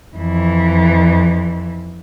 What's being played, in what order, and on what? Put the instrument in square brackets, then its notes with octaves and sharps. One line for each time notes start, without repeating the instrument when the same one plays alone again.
[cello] F2 E3